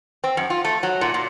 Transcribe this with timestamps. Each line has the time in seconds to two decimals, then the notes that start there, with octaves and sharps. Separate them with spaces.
0.24 C4
0.37 F#2
0.50 F4
0.65 A3
0.83 F#3
1.01 A#2
1.14 A#2